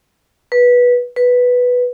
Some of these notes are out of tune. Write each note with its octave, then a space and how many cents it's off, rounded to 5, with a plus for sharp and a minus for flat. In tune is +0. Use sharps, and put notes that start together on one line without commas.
B4 -15
B4 +0